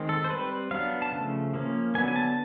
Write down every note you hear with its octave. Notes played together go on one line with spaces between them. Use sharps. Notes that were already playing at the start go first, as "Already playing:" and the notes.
Already playing: D#3 G#3 C4
A4
C5
G3 C4 B4
F#3 B3 D4 F5
A5
C#3 F3 A3
F3 A#3 C#4
D3 F#3 B3 D4 G#5
G#5
A5